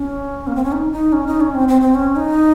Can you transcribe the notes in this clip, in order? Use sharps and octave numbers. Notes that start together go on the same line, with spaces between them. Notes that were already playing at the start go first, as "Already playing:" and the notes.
Already playing: C#4
A#3
C4
C#4
D#4
D#4
C#4
D#4
C#4
C4
C4
C4
C#4
D#4